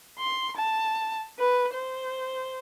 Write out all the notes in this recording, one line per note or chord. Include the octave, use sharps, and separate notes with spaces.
C6
A5
B4
C5